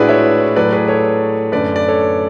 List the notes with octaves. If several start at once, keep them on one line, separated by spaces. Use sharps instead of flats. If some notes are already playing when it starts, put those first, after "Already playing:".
Already playing: A2 G#3 D4 E4 F#4 G#4 B4 D5
C#5 E5
A2 F#3 A3 B4 D5
G#4 B4
A4 C#5
F#2 D3 A3 B4 D5
B4 D5
A4 C#5